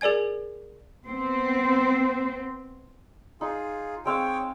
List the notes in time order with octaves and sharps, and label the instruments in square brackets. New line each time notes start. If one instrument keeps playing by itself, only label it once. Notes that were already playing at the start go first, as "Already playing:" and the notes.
[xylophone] G#4 A#4 D5 G#5 G#6
[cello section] B3 C4 C5
[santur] D#4 [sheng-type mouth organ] F4 G#4
[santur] G#3 C4 F5 [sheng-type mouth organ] C#5 G5